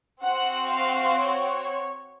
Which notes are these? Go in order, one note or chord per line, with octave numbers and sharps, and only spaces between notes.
C4 F#4 F#5
F5
C#5